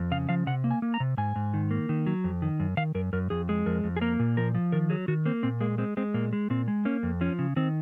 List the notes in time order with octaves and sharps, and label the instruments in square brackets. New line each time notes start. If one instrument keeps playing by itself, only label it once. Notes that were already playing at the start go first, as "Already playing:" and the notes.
Already playing: [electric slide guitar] F2
C#3 F5
F3 F5
C3 F#5
A#3
G#5
A#3
A#5
C3
G#2 G#5
G#2
D#3
A#3
D#3
F#3
F2
D#3
F#2
D#3 F5
F#2 A#4
F#2 A#4
F2 G#4
G#3
F2 A#4
F2
G#4
A#3 A#4
A#2
F3 A#4
F3
D#3 A#4
F#3 G#4
D#3 F#4
A#3 C4
A#2 C4
G#3 A#3
G#3 C4
G#3 C4
A#2 A#3
G#3
A#2 C4
G#3
A#3 C#4
F2
F3 C#4
C#3
D#3 C4